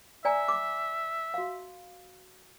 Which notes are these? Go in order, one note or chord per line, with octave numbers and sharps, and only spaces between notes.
D5 E5 G#5 A#5
D6
F#4 F5